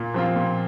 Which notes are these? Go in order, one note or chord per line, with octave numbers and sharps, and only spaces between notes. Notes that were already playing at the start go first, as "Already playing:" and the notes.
Already playing: A#2
F3 C4 F4
A#2